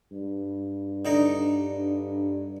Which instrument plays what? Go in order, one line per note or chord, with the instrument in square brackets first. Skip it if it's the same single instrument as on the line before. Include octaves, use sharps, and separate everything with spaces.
[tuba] G2
[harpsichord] D3 D#4 A#5